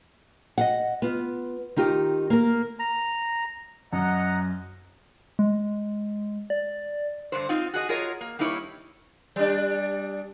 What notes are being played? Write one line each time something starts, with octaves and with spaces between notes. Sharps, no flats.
D#5 F5 F#5
B3 F4
D#3 D#4 F4 G4
A#3 A#4
A#5
F#2 D#5 F#5 A#5
G#3
D5
G2 D3 C5
C4 D#4 F4
F#4 G#4 D#5
F4 G#4 A#4 C#5 D#5
A#3
G3 A#3 D#4 E4 A#4 C#5
G3 D4